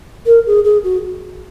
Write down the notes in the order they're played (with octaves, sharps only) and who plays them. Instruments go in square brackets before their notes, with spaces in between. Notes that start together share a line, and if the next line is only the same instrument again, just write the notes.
[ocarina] A#4
G#4
G#4
F#4